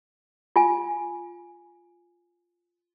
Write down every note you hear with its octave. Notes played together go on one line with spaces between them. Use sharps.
F4 G#5